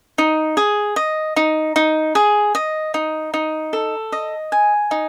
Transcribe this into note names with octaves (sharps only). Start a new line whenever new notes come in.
D#4
G#4
D#5
D#4
D#4
G#4
D#5
D#4
D#4
A4
D#5
G#5
D#4